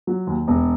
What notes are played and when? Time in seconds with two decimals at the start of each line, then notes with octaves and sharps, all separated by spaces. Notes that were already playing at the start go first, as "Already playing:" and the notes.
0.07 F#3
0.27 D#2
0.48 E1